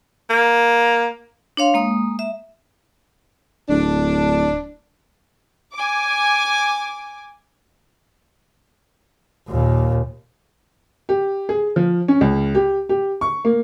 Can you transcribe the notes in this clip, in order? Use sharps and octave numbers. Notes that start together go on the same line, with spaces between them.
A#3
D4 C#5 F5 C6
G#3 A#3 D#6
E5
D1 D4
G#5 D6
D#2 A#2
G4
G#4
F3
C#4
C#2
G4
G4
C#6
A#3